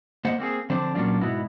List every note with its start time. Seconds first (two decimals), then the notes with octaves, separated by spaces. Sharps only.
0.25 A#3 C5 D#5 F#5
0.39 A#3 C4 F#4 G#4
0.70 D3 F3 C4 D4 C5
0.95 A#2 F#3 A#3 C#4 D4 F4
1.21 G#2 B2 B3 E4 F#4